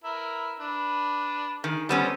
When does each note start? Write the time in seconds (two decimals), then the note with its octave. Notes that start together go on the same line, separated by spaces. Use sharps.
0.04 E4 A#4 B4
0.60 D4 B4
1.64 D#3 G#4
1.89 G3 B3 C#4 A4 C5 D#6